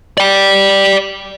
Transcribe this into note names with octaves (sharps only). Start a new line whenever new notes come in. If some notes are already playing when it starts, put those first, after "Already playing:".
D5 G5